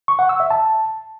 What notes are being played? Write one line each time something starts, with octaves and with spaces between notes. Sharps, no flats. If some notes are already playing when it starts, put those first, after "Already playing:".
C#6
F#5
E6
E5
A5